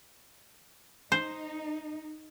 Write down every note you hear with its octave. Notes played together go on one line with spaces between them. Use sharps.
D#4 C5